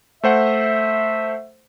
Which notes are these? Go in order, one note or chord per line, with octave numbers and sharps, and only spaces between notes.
A3 C5 E5 F#5